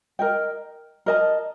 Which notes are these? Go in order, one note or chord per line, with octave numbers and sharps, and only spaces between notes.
A#4 D#5 G5
A#4 D#5 A5